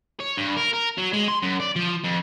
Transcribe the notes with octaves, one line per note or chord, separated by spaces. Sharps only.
C#5
G2
A#4
A#4
F#3
G#3
C6
F#2
D5
F3
F2